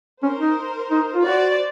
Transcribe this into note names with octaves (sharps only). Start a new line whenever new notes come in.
C#4 A#4 C5
D#4
D#4
F4
F#4 C5 D5